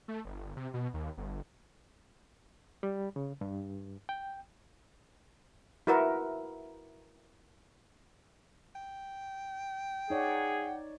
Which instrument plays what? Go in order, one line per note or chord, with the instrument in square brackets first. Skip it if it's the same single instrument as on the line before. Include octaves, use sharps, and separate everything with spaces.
[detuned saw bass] A3
G1
C3
B2
D#2
G1
[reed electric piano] G3
C#3
G2
G5
[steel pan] E4 F#4 A#4 B4 E5 F#5
[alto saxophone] G5
[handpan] D#4 C#5 D5 [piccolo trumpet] G#4 [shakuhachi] F#5